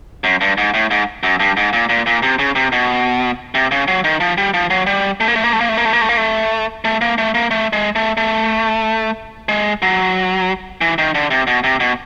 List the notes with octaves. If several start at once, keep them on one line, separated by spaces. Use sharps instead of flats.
F#2
G2
G#2
A2
G#2
F#2
G2
G#2
A#2
A#2
A#2
C3
C#3
C3
B2
C3
C#3
F#3
D#3
F3
G3
F3
F#3
G3
A3
A#3
A3
A#3
A3
A#3
A3
A#3
A3
A#3
A3
A#3
A3
A3
A#3
A3
A#3
A3
G#3
A3
A3
G#3
F#3
E3
D#3
D3
C3
B2
C3
B2